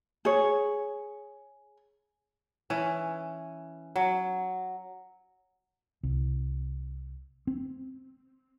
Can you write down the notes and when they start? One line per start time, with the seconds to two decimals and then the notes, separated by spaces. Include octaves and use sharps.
0.25 G#4 C#5
2.70 E3 C#4
3.95 F#3
6.03 C2
7.47 C4